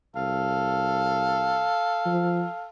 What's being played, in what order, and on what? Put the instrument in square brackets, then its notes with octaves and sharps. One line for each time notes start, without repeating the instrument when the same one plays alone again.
[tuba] C2 [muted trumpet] A4 [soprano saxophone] F5
[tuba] F3